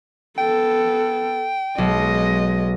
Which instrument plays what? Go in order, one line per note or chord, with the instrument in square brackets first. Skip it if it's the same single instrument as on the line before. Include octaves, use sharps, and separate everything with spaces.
[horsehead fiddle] B3 A4 [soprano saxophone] G5
[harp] B1 [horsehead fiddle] G#3 D#5